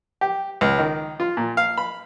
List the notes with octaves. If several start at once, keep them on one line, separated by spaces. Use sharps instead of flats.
G4
C#2
D#3
F4
A#2
F5
B5